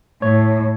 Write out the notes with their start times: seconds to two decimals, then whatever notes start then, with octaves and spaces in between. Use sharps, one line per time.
0.22 A2 C#5